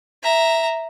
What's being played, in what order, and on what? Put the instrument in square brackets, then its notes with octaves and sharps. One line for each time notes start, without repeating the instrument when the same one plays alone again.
[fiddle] E5 A#5